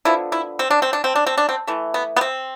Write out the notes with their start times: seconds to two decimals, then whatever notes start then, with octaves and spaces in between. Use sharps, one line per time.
0.05 D3 F3 B3 E4
0.32 E4
0.59 C4
0.70 D4
0.82 C4
0.93 D4
1.04 C4
1.15 D4
1.26 C4
1.37 D4
1.49 C4
1.67 E3 A3
1.94 B3
2.16 B3
2.21 C4